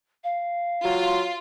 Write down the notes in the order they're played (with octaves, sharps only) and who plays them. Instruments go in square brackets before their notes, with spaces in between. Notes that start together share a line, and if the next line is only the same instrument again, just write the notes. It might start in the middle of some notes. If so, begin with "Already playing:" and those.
[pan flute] F5
[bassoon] F#3 [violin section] F4